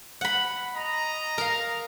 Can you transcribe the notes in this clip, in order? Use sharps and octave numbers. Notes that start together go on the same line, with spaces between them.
F#5 B5
D#5 A#5
A#4 F5